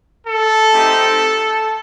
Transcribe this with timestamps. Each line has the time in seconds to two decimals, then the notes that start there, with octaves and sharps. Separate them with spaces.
0.27 A4
0.73 A3 C4 D#4 G4